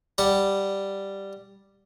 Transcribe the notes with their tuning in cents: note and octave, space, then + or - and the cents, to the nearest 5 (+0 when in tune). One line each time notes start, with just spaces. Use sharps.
G3 +0 F#5 +0